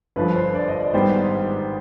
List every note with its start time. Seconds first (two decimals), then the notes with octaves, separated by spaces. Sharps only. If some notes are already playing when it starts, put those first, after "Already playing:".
0.16 G1 G2 F3 B4
0.36 C5
0.55 D5
0.68 D#5
0.81 D5
0.93 G#1 G#2 G3 B3 C5